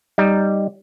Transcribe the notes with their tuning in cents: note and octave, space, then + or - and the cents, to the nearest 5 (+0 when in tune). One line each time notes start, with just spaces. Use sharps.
G3 +0 D#4 -5